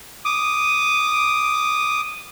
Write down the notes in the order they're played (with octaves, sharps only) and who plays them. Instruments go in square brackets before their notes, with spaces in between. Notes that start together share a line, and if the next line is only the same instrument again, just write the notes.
[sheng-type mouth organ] D6 D#6